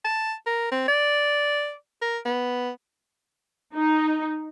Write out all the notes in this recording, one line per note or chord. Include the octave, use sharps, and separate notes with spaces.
A5
A#4
C4
D5
A#4
B3
D#4